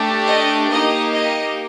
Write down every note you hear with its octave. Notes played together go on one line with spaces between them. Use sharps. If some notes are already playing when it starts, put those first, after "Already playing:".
Already playing: A3 D4 G4
D#5
A#3 D#4 G4 D#5
D#5